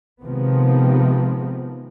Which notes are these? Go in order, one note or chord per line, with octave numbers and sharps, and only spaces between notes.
C3 D#3 F3 G#3 B3 C4